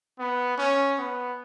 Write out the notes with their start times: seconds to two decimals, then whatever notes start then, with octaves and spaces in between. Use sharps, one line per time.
0.19 B3
0.57 C#4
0.98 B3